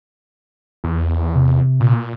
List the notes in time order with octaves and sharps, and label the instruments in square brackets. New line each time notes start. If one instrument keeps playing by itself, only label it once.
[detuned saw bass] E2
[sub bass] C3
[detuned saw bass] A#2